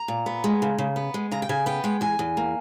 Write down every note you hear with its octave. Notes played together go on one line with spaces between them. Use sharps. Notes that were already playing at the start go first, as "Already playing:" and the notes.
Already playing: A#5
A#2
B3
G#3
C#3
C#3
B3
G#3
C#3 A#5
G5
C#3 G#5
B3 G5
G#3 G5
E2 G#5
E2
A#3